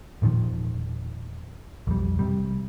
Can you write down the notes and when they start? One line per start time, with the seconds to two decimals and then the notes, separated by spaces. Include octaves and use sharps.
0.22 E1 A#2 D#3 F3
1.87 B1 F2 G3
2.19 C3 G3